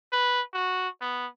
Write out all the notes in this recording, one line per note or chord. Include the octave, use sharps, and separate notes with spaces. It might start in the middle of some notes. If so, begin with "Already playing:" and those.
B4
F#4
B3